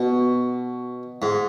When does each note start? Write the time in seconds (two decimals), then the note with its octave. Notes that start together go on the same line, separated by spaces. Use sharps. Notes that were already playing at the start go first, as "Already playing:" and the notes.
Already playing: B2
1.22 G#2